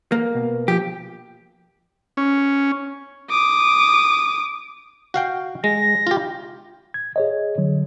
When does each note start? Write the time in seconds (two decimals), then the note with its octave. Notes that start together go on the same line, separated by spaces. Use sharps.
0.12 A#3
0.35 B2
0.68 F3 G4
2.17 C#4
3.30 D6 D#6
5.14 F#4 F5 G5
5.64 G#3 A#6
6.07 F4 G4
6.94 G#6
7.16 G#4 C#5 D#5
7.58 D3 F#3